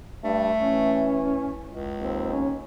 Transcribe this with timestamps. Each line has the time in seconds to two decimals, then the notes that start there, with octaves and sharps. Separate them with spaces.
0.24 G2 A3
0.61 E3 C#4
1.70 C#2
1.99 D#2 C4
2.32 C#4